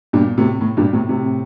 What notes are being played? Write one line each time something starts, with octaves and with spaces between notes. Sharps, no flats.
G2 A#2
A2 C3
A2
G2 A#2
A2 C3
A2 C3